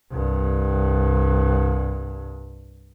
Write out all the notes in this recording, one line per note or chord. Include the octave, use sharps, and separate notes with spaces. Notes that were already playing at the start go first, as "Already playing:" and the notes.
C2 G2